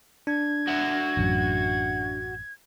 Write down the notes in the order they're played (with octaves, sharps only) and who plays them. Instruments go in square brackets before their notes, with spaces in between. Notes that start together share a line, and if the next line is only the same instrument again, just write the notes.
[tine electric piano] D4 [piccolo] G#6
[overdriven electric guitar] F#4 E5
[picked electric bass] A1 F#2